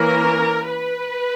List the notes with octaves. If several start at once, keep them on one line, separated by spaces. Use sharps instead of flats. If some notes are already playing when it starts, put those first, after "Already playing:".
Already playing: E3 A#3 C#4 A#4
B4